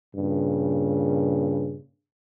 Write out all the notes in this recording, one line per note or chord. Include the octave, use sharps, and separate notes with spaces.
G2 A#2 C#3